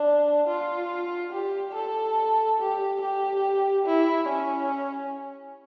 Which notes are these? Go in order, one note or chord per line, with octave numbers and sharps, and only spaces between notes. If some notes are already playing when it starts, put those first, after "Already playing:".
Already playing: D4
F4
G4
A4
G4
G4
E4
C#4